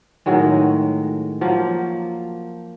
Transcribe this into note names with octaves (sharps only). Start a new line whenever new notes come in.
A2 D#3 F#3 G#3
F3 F#3 A#3